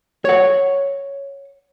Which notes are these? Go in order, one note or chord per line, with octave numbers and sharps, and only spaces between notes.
C#5 F#5